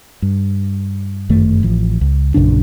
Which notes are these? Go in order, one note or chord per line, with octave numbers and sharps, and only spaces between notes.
G2
G1 F#2 D#3 A3
A1 F3
C#2
A#1 F#2 C#3 D4